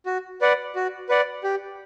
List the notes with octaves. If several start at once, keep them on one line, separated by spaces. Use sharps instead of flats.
F#4
B4 D5 F#5
F#4
B4 D5 F#5
G4